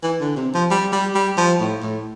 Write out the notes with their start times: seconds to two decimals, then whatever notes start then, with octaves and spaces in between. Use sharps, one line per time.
0.03 E3
0.20 D3
0.36 C3
0.54 F3
0.71 G3
0.93 G3
1.15 G3
1.37 F3
1.60 A2
1.82 A2